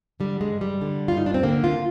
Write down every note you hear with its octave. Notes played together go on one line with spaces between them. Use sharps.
D3 G3
G#3
G2
G3
D3
F4
G2 D#4
D4
C4
D3 A#3
F4